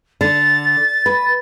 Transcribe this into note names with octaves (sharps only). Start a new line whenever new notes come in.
D3 A6
B4